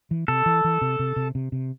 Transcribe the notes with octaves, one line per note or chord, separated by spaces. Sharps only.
E3
C3 A4
E3
E3
C3
C3
C3
C3
C3